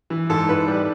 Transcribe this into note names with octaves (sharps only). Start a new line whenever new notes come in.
E3
G#2 A4
G#2 B4
G3